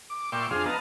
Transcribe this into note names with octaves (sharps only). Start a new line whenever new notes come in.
D6
A#2 D5 E5 G5 C6 C#6
F2 D4 G#4 F5 C6
B3 D#5 F5 A5 A#5